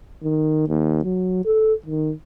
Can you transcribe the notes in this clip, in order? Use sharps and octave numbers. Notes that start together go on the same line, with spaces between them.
D#3
D#2
F#3
A4
D#3